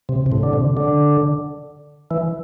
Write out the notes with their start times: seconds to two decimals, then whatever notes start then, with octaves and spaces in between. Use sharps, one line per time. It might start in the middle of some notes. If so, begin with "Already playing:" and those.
0.09 C3
0.26 C3
0.32 A2
0.43 D3
0.53 C3
0.77 D3
2.11 E3